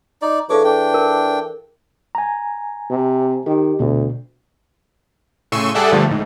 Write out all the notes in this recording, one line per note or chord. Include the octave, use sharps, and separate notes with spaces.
D#4 D5
E3 D4 G#4 A4 C#5 F5 D6
D4 G5
A#4
G#5 A#5
C3
D#3 G4
D2 B2
A2 C#3 C6 C#6 E6 D#7
G3 G#4 A4 D5 E5 F#5
G2 D3 F3 G3 A3
A1 G#2